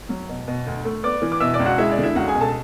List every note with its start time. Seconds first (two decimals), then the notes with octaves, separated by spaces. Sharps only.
0.09 F#3
0.29 B2
0.48 B2
0.67 D2
0.85 A3
1.04 B3 D5 D6
1.22 E3
1.32 D6
1.40 B2 E5 E6
1.53 D5 D6
1.59 C#2
1.65 F#4 F#5
1.78 G#3 E4 E5
1.91 D5
1.98 D3
2.03 E4 E5
2.15 C#2 F#4 F#5
2.28 G#4 G#5
2.35 B2
2.41 A4 A5